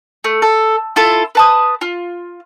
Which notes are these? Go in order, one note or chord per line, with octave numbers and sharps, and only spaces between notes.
A3
A4
E4 F4 A4
B4 A5 D#6
F4